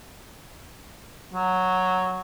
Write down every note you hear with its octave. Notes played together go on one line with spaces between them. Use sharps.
F#3